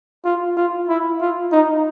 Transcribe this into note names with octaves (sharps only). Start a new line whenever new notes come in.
F4
F4
E4
F4
D#4